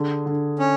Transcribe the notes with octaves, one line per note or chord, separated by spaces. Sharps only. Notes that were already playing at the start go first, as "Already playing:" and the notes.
Already playing: D3 G#4
D3
C#4